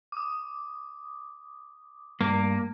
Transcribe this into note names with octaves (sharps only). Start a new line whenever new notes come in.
D6 D#6
G2 A3 A#3